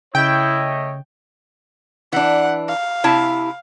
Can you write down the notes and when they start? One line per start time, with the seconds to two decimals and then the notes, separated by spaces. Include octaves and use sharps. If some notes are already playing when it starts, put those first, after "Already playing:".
0.15 C#3 A3 E4 C#5 D#5 G5
2.13 E3 D4 F#5
2.68 F5
3.04 C3 E4 A5